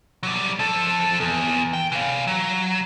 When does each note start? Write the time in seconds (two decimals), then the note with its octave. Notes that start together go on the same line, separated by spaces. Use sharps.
0.23 F#3 G3
0.59 F3 A4
1.20 E2
1.73 G5
1.92 E3 F5
2.27 F#3